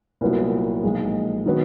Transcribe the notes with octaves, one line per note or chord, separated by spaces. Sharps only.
C2 A#2 F#3 B3
B1 A#2 F3 G#3
D#3 F#3 B3